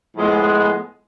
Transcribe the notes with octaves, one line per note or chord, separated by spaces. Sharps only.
A2 F3 G#3 B3